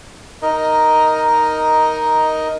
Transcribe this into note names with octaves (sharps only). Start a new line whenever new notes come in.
D#4 A#4 D#5